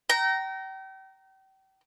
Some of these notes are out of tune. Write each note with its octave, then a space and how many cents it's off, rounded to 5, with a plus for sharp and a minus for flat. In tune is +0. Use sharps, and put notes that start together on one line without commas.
G5 -35 A#5 +0